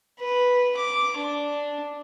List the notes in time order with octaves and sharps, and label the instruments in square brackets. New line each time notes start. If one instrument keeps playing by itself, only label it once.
[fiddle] B4
D6
D4